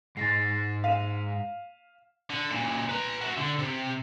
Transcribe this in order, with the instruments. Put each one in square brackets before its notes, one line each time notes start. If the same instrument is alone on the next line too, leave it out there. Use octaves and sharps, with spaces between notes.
[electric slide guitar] G#2 G#3 [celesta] A6 A#6 C7
[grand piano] F5 [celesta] B6 D#7 E7
[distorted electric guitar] D3
C#2 A#2
B4 A#5
F#4 E5
D3
C3